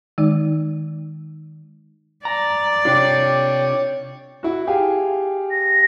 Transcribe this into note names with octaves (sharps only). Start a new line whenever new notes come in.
D#3 G#3 D#4
D5 A#5
C3 D4 F4 C#5 G5 D6
E4 F#4
G4 G#4 F5
A#6